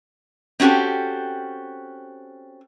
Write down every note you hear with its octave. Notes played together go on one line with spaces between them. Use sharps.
C4 C#4 F#4 G4 A4